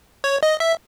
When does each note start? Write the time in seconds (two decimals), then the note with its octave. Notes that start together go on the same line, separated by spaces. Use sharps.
0.24 C#5
0.43 D#5
0.60 E5